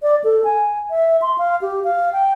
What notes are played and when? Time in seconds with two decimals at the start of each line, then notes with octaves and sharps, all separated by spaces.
0.02 D5
0.24 A4
0.44 G#5
0.90 E5
1.22 C6
1.38 F5
1.62 G4
1.84 F5
2.13 G5